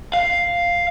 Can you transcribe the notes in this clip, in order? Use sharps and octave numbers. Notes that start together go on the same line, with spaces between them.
F5